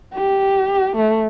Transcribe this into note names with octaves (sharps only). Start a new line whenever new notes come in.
G4
A3